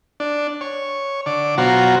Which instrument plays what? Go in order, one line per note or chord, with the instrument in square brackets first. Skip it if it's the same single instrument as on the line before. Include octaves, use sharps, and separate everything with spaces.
[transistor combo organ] D4
C#5
D3 D5
B2 F#3 F4 F#4 C5 A#5